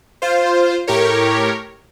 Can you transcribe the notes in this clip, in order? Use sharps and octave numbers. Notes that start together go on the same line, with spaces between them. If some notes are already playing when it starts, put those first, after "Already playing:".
F4 C5
A2 G4 A#4 C#5